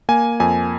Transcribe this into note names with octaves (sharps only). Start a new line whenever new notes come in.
A#3 G#5
F2 G#5